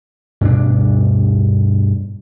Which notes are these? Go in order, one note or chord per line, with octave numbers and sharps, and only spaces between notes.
G2 B2 C#4 D4